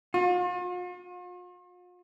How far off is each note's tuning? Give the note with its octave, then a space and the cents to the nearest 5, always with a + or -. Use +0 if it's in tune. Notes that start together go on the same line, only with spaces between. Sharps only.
F4 +45